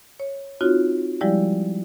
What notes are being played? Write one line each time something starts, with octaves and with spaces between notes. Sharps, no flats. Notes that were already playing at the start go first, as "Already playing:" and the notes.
C#5
C4 D#4 F4 F#4 C#5
F3 G3 G#3 E4 G4 D5